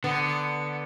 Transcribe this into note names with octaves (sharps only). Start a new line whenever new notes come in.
D3 B3